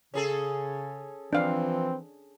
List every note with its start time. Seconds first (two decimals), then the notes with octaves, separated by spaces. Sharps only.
0.14 C#3 C#4 G#4 A4
1.33 E3 F3 C4 D4 F5